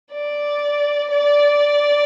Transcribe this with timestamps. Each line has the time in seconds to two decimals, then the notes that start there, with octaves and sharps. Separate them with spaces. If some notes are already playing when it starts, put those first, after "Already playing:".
0.12 D5
1.11 D5